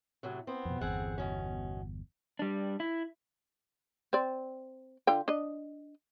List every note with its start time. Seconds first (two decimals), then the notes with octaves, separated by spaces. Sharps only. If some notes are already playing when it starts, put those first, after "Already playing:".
0.23 A2 C3 F#3
0.47 B3 C4
0.65 F2 B2
0.81 G1 E2 C4 G#4 F#5
1.18 B2 C#4
2.39 G3 D4
2.80 E4
4.13 C4 D5
5.07 D3 F4 G5
5.28 D4 D#5